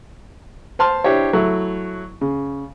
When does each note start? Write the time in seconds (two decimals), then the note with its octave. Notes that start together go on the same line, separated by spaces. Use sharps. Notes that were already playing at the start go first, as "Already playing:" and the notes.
0.79 C5 A5 C6 F6
1.04 D4 E4 G4 C5 C#5
1.33 F#3 A3 E4
2.21 C#3